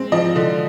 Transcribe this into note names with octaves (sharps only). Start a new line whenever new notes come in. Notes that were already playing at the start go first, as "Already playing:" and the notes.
Already playing: G#3 C4
F3 D#5
D3